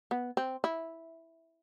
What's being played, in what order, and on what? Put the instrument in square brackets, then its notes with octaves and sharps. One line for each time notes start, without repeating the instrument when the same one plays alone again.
[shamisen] B3
C4
E4